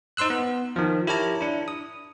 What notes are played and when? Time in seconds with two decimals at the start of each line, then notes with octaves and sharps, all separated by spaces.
0.17 D#4 C5 C6 E6 F#6
0.30 B3
0.76 D#3 F3
1.07 E4 G4 A#4 C#5 A5 A#5
1.41 D4 E4
1.68 D#6